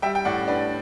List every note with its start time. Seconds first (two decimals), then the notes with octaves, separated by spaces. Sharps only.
0.02 G3 E5 G5
0.15 G5
0.25 A2 D5 F#5
0.47 D4 B4 D5